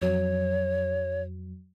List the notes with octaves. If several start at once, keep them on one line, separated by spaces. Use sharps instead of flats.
F2 F#3 C#5